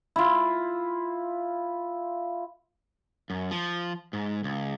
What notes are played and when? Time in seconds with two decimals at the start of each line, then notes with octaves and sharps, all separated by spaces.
0.16 E4 F4
3.30 F#2
3.51 F3
4.13 G#2
4.44 C#2